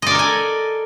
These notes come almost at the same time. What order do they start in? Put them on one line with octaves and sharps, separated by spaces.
D#5 D5 A#4 A4 G#5